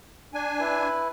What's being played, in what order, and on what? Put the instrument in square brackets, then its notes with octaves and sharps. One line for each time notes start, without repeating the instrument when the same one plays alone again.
[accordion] D4 G#5
[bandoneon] E4 B4